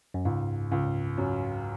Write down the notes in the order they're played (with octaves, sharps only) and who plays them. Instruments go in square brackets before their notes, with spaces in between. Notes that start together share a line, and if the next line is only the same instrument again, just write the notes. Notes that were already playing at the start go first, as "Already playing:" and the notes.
[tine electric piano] F#2
[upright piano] C#2 [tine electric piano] G#2
[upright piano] C#2
F#2